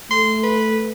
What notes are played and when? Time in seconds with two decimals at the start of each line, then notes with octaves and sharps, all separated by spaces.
0.11 A3 C6
0.43 B4